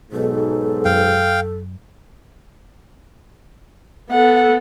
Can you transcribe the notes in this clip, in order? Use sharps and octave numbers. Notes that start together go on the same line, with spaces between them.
B1 G#2 B2 A4
F#2 F5 G5
B3 A4 F#5